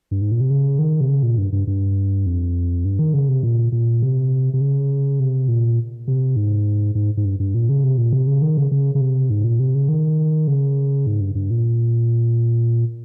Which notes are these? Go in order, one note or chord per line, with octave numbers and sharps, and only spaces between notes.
G2
G#2
A#2
C3
C#3
D#3
C3
C#3
A#2
G2
G2
G2
F2
G2
D#3
C#3
C3
A#2
A#2
C3
C3
C#3
C3
A#2
C3
G#2
G#2
G#2
G2
G2
A#2
C#3
C3
A#2
C3
C#3
D#3
C#3
C#3
C#3
C3
G#2
A#2
C3
C#3
D#3
C#3
G#2
G2
G2
A#2